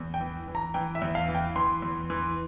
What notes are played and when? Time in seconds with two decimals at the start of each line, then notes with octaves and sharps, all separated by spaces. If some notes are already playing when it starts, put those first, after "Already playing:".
Already playing: E2
0.14 G5
0.21 E3
0.48 E3
0.55 A#5
0.74 E3 G5
0.95 E5
1.02 E2
1.15 F5
1.29 E3
1.35 G5
1.56 E3 C6
1.82 E2
2.10 E3